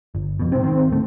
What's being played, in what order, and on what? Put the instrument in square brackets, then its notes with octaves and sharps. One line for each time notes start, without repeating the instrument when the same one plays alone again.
[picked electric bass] G1
F2 B2
[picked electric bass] G#2 C3 [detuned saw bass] C4
[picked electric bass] D#3
D1 A3